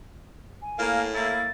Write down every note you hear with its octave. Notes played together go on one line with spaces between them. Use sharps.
G#5
A2 A#3 A#4 F5
A#3 E4 A6